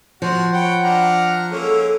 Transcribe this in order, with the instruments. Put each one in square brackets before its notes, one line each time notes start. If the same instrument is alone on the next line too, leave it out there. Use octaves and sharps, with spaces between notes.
[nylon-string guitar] F3 [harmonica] F#4 F#5
[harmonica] C#5 G5 B5 [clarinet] F#5
[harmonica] D4 A#5 F6
[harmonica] G#3 A#3 C#4 [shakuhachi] A4